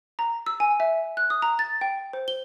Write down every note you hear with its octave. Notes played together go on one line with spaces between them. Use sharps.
A#5
E6
G#5
E5
F#6
D#6
A#5
A6
G5
C5
G7